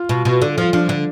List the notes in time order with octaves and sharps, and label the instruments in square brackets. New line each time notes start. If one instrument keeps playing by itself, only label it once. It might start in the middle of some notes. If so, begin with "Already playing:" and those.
Already playing: [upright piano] F4
[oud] B2
B2
D3
[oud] F3 [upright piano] F4
[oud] F3 [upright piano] D4
[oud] D3